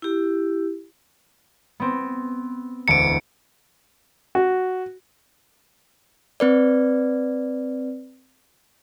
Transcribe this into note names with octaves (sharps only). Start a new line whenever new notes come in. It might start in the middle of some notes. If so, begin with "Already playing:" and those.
E4 G4
B3 C4
E1 D2 A5 C#7 D7
F#4
C4 B4 D5